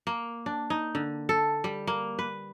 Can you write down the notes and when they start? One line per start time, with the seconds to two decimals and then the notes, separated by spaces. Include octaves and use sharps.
0.07 A#3
0.46 D4
0.70 D#4
0.95 D3
1.29 A4
1.64 G3
1.87 A#3
2.19 B4